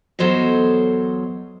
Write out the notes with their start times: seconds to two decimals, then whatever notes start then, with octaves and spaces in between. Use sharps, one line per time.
0.19 E2 F#3 A4 C5 C#5 D#5